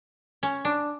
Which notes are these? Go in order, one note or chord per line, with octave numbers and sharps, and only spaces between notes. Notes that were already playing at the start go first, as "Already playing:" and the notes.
C#4
D4